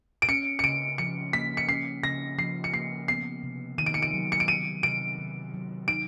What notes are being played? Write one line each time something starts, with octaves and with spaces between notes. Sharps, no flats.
D7
C#4 C#7
C#7
C#3 D7
F3 C#7
A#3 B6
C#7
C#4 C7
C#3 A#6
F3 C7
C#7
A#3 C7
B3 C7
C3
D#3 D#7
D7
C#7
D7
F#3
C#7
D7
B3 D#7
C3 D7
D#3
F#3
D#4 D7